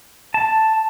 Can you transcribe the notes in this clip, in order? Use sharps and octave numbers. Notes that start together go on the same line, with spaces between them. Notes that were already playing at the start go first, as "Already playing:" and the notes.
A5